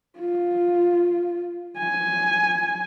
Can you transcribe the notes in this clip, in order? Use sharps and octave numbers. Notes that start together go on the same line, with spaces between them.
F4
G#5